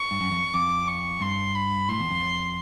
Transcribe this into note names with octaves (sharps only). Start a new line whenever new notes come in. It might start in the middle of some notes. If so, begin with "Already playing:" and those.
Already playing: C#6
G2
F#2
F2
F2 D6
C#6
G2 C6
B5
A2 C6
E2
F2